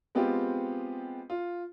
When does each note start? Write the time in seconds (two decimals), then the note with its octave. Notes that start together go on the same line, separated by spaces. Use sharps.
0.15 G#3 B3 C4 F4 G4
1.30 F4